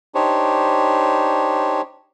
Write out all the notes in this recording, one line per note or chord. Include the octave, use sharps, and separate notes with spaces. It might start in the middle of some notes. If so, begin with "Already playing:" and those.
D4 D#4 G4 C5 C#5